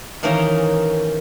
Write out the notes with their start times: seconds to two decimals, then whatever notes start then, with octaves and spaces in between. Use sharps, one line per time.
0.23 D#3 E3 A#3 C#4 D#4